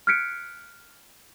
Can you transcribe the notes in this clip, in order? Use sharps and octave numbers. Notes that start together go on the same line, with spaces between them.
F6 F#6 G#6 B6 C#7 D7